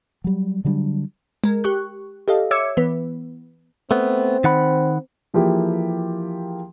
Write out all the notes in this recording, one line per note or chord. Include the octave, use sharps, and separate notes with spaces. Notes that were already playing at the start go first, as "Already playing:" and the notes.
F#3 G3
D3 F#3 G3 D4
G#3 A#4
G4 C#6 F#6
G4 A4 D#5 F5
C#5 E5 D6 E6 G#6 C#7
E3 B3 B4
A3 B3 C4
D#3 F#5 B5
E3 F3 A#3 E4 G4 G#4